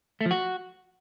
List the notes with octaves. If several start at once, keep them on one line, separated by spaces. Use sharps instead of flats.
A3
F3
F#4